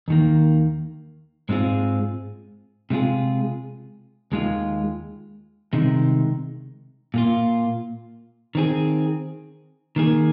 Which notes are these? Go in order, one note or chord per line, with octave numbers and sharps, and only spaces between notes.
D#2 D#3 A#3
G#2 G#3 C4 F4 G#4
C3 G#3 F4 G#4
D#2 D#3 G#3 F4
C2 C3 D#3 G#3
A#2 A#3 F4
D#3 C4 G#4
D#3 A#3 G#4